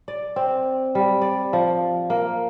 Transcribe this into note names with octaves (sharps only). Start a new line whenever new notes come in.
D5
C4
G3
D5
F3
A#3